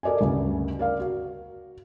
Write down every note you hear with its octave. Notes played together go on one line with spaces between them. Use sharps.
A4 A#4 D5 D#5 G#5
D2 G2 C#3 A3
A#4 D5 F5
F#4